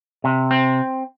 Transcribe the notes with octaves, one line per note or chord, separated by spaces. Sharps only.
C3
C4